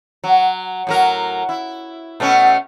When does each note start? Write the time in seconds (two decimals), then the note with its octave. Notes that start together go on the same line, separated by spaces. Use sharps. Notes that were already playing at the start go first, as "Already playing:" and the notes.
0.24 F#3
0.87 A2 F#3 A#4
1.49 E4
2.20 B2 A3 C#4